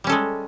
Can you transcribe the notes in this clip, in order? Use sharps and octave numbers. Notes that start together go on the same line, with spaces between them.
G3 G#3 C#4 A4